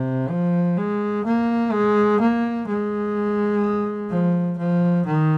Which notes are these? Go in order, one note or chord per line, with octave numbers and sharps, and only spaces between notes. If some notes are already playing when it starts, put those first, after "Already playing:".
Already playing: C3
F3
G#3
A#3
G#3
A#3
G#3
F3
F3
D#3